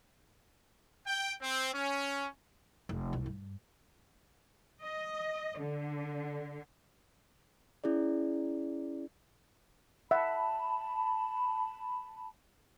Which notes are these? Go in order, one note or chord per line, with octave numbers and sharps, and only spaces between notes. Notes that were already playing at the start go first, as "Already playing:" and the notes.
G5
C4
C#4
F1
C2
G2
D#5
D3
C#4 E4 G#4 D5
E5 F#5 A5 B5